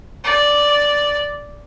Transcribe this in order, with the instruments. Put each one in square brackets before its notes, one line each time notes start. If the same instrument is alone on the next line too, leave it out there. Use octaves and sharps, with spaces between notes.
[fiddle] D5